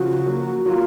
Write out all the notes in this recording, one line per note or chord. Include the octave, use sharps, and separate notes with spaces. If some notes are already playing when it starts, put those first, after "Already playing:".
Already playing: C#3 F3 F#4
F#3 A#3
F#3 A#3 F4